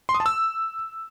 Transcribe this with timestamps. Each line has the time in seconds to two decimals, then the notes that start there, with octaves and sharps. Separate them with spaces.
0.09 C6
0.14 D#6
0.20 A5
0.26 E6